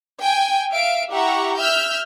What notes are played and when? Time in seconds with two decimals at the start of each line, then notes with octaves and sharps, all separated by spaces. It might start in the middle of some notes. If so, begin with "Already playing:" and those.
0.21 G5 G#5
0.72 E5 F5 D7
1.11 E4 G4 E5 F#5 A#5 C#6
1.56 E5 E6 F6 G6